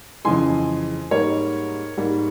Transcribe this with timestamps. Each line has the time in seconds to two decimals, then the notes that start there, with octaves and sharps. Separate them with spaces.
0.25 F2 C#3 E3 G#3 G#5 C6
1.11 G#2 G3 A#3 A#4 C#5
1.97 G#2 G3 A#3